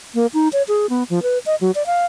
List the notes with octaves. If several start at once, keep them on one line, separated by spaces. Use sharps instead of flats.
A#3
D#4
C#5
G#4
B3
F3
B4
D#5
F#3
D5
F5